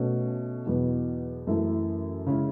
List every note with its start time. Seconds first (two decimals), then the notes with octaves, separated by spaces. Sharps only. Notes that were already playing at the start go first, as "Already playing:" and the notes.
Already playing: B2 A3 C#4
0.67 E2 B2 F#3 B3
1.47 F#2 E3 A3 E4
2.26 C#3 G#3 C#4 E4